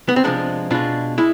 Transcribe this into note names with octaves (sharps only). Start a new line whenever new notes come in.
B3
C4
C3 F3 G#3 B3 D4
B2 G#3 D4 F4
G#3 E4